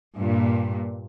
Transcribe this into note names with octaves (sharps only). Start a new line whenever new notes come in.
G2 A#2